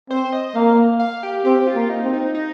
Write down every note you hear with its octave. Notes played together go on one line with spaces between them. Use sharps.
C4 C5
D#5
A#3 F5
F5
G4
C4 G4
F4
A#3
D#4
C4
D#4
D#4